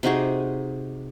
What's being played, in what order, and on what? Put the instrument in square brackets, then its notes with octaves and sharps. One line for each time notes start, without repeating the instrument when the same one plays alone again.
[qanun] C3 D#4 F#4 G#4